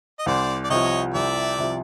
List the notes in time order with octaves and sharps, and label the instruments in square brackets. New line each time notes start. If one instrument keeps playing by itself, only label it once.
[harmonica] D#5
[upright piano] C2 [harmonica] C5 D5
[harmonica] D5
[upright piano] C3 F3 [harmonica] C#5 D#5
[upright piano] C2 [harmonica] D5 E5
[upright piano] C3 F3